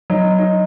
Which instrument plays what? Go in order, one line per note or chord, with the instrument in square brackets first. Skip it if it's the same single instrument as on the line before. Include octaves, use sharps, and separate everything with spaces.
[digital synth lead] F#3 [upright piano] D#4
[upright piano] D#4